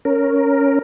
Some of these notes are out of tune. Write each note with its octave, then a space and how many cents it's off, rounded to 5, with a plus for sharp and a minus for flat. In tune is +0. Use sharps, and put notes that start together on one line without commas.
C#4 +0 A#4 +0